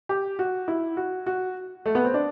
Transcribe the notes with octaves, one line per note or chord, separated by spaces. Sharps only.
G4
F#4
E4
F#4
F#4
A3
B3
C4
D4